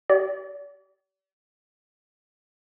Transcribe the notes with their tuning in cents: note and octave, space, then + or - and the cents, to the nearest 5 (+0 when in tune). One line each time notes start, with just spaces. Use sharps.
G4 -40 D5 -40